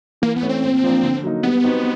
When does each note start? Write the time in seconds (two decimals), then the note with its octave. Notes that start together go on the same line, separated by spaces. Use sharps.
0.22 E3 A#3
0.36 B3
0.42 A3 C#4
0.49 C4
0.63 A#2
0.84 F3 A#3 D4
1.03 D3
1.23 F#3 A#3 D#4
1.43 G3 B3
1.64 C4 D#4 F#4 B4